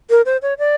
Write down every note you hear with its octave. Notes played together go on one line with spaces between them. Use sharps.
A#4
C5
C#5
D5